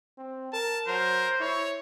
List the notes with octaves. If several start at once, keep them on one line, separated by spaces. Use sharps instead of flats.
C4
A#4 A5
F#3 A#4 C5
E4 C#5